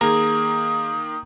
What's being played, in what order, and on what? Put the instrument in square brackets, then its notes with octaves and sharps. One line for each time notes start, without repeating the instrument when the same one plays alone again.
[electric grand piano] D#3 A#3 [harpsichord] G#4 [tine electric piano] A#5 [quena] D#6